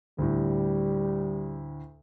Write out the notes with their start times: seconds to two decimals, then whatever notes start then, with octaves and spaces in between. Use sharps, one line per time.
0.19 D2 A2 G3